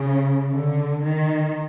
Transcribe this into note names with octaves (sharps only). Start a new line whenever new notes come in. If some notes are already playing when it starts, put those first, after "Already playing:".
Already playing: C#3
D3
D#3